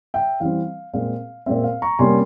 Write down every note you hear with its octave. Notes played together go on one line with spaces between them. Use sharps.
E5 G5
E3 G3 C4 F5
A#2 G#3 C4 F5
A#2 G#3 C4 E5
F5
A#5 C#6
C3 G3 A#3 C#4 G#5 C6